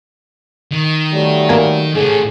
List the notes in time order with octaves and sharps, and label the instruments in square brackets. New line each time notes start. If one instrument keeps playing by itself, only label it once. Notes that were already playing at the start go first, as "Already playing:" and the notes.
[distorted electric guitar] D#3
[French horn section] F#3 G3 A3
[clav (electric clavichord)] A#3 G#5
[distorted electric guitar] A2 C#4 [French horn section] G#4 A4